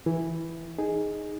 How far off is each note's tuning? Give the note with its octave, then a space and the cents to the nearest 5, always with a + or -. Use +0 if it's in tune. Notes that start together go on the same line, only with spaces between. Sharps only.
E3 +0 E4 +0
D#4 +0 G#4 +0